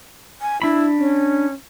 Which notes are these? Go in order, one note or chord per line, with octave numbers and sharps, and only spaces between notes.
G#5
D4 E4 B5
C#4